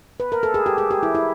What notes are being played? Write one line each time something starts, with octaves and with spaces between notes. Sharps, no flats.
B4
A#4
A4
G#4
G4
G#4
G4
E4
E4